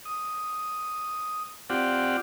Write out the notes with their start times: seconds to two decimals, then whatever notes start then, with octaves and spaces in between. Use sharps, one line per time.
0.05 D#6
1.70 C4 F4 G4 D5 F#5